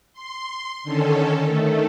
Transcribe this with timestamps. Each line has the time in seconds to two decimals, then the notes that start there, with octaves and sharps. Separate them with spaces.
0.13 C6
0.83 D3 D#3 C#4 A4
1.45 D#3 A3